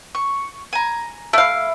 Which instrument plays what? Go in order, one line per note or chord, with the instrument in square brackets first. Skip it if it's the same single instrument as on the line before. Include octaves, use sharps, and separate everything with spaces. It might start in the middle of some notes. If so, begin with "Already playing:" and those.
[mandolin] C#6
G#5 A#5
[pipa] A3 F5 [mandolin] E4